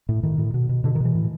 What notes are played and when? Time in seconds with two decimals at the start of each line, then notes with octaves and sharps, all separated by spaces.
0.09 A2
0.23 A2 D#3
0.38 A2
0.54 B2
0.69 B2
0.84 B2 D3
0.95 D#3
1.00 B2 E3
1.15 A2